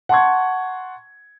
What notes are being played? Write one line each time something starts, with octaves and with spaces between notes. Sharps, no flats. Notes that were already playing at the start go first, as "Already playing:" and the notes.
F#5 A5 C6 C#6 G#6